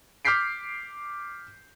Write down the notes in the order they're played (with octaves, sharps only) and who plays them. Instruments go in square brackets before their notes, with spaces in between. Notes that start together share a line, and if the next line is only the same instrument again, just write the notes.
[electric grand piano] D6 F6 G6 B6 C7 D7